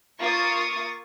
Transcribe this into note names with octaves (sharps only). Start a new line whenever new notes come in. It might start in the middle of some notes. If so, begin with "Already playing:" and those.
A#3 F4 A#4 C#6 D#6 A6